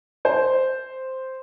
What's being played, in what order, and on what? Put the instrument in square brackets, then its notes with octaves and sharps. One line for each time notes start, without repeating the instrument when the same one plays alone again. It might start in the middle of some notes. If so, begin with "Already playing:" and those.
[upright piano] C5